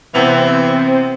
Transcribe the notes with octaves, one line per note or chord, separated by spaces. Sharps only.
C3 E3 B3 C4 F7